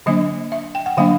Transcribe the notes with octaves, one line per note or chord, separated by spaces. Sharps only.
D3 F#3 A#3 D4 D#5
E5
G5
F#5
D3 F#3 A#3 D4 F5